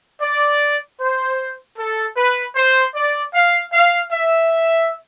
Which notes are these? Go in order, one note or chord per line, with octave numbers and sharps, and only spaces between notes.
D5
C5
A4
B4
C5
D5
F5
F5
E5